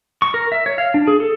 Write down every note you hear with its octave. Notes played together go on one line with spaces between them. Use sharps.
C#6
A#4
E5
C#5
F5
D4
G#4
A4